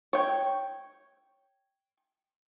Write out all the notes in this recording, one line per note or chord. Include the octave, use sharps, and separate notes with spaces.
C#5 G5